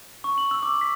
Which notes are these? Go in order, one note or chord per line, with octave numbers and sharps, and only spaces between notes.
C#6
F#7
E6
D6
B6